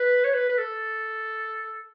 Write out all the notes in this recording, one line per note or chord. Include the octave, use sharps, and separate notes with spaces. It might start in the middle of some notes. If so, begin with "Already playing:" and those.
Already playing: B4
C#5
B4
B4
A4